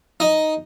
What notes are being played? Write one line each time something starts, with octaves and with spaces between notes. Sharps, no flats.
D#4